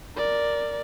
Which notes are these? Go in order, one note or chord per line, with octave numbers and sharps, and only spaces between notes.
A#4 D5